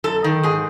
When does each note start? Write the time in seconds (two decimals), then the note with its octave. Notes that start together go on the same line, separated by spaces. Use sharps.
0.04 F#2 A4
0.24 D#3
0.43 G#2 G#4